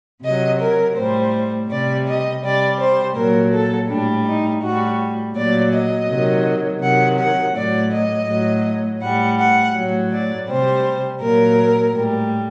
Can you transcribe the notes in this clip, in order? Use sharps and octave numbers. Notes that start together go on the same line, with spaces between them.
C3 F#3 D#5
A#4
A2 G3 C5
C3 G3 D5
D#5
C3 G3 D5
C5
A#2 F#3 A#4
A4
A2 G3 D4
D#4
A2 G3 F#4
A#2 F#3 D5
D#5
C3 D#3 F#3
C3 D#3 F#3 F#5
F#5
A2 F#3 D5
D#5
A2 F#3
A2 G3 F#5
F#5
A2 F#3
D5
C3 G3 C5
A#2 F#3 A#4
A2 G3